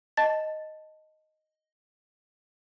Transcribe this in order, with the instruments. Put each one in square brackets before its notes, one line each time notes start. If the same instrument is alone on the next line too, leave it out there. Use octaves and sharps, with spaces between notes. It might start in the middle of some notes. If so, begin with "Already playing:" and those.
[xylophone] D#5 A5 A6